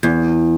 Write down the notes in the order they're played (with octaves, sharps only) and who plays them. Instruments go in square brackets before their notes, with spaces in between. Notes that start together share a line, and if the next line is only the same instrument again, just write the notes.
[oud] E2